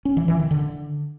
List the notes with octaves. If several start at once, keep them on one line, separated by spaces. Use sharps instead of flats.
C#4
E3
E3
D#3
D3